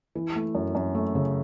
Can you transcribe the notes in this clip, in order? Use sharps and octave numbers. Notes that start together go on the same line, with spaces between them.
E3
A3
F#2
F#2
A3
C#3